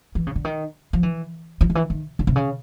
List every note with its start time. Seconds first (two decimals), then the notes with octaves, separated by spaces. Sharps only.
0.15 E3
0.27 C#3
0.35 D3
0.45 D#3
0.93 F3
1.03 E3
1.61 F3
1.70 D#3
1.75 E3
1.90 D#3
2.19 C#3
2.27 C3
2.36 C#3